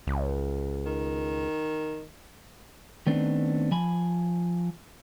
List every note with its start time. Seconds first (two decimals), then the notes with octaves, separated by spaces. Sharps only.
0.07 C#2
0.86 D#3
3.07 D#3 A3 B3 C4 D4
3.72 F3 G#5 B5